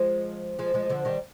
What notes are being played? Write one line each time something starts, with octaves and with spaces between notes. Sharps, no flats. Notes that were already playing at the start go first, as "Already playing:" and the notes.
Already playing: F3 G#3
F3 G#3
F3 G#3
D3 F3
D#3 G3